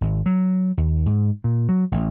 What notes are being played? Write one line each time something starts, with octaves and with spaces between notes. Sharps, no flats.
G#1
F#3
D#2
G#2
A#2
F#3
A1